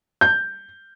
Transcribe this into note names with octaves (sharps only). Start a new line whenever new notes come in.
G6